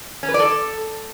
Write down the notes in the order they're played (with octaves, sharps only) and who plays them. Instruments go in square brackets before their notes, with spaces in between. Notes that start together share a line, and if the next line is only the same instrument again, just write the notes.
[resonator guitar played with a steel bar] C#4
B4
D5
A4